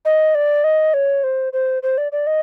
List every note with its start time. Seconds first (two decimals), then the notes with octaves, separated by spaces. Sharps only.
0.05 D#5
0.35 D5
0.64 D#5
0.94 C#5
1.24 C5
1.53 C5
1.83 C5
1.98 D5
2.12 D5
2.27 D#5